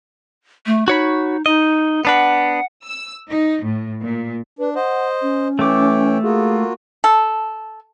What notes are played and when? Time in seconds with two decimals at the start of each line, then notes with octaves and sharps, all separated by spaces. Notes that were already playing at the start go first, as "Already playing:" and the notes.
0.66 A3
0.88 D#4 F#4 C#5 B5
1.46 D#4 D#5
2.05 B3 D4 B4 F#5
2.87 E6
3.27 D#4
3.61 A2
4.01 A#2
4.59 D4 B4
4.76 C5 D#5 F#5
5.22 C#4
5.59 E3 A3 C#5 G5 D6
6.23 A#3 F4 F#4 G#4
7.04 A4